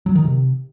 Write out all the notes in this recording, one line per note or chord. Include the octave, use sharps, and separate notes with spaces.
F#3
D#3
C3